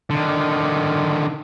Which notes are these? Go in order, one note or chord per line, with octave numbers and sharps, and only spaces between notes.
D3 D#3